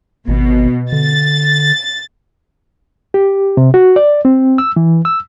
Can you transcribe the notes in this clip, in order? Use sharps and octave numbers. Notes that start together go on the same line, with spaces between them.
G#1 B2
D3 A6
G4
C3
F#4
D5
C4
E6
E3
E6